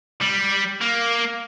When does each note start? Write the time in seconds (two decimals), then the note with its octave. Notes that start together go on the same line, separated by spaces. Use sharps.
0.21 G3
0.81 A#3